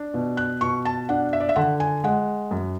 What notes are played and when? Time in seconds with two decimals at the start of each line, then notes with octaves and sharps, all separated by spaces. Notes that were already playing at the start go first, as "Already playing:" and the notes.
Already playing: D4
0.14 B2
0.37 F#6
0.61 B2 C#6
0.85 A5
1.09 D4 F#5
1.33 E5
1.40 D5
1.49 E5
1.56 D3 F#5
1.80 G#5
2.04 G#3 F#5
2.51 F#2